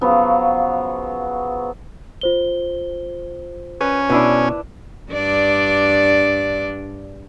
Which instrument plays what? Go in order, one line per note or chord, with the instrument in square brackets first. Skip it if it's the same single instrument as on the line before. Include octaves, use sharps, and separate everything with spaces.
[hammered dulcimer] C#3 F3 F#3 B3
[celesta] F4 C5 G7
[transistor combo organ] C#4 [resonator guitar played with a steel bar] B4
[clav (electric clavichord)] B2 [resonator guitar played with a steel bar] D4 E4 B4
[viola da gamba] G2 D4 D5